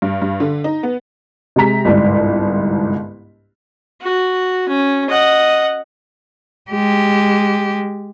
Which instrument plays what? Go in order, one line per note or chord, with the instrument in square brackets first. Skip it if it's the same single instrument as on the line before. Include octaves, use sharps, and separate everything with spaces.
[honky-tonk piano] G2
G2
D3
D#4
B3
C3 G#3 A#5 B6
G1 C2 G#2
[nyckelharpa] F#4
C#4
D#5 F#5
[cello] G#3 G4